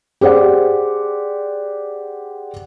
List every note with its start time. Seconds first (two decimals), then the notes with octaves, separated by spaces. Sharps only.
0.21 G4 G#4 C5 D5 F#5